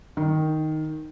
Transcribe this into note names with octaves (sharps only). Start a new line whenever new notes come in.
D#3